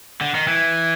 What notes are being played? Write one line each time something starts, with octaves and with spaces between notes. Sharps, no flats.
D3
D#3
E3